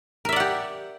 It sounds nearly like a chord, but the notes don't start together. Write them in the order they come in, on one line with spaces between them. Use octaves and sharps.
A#4 E5 D5 F#5 G4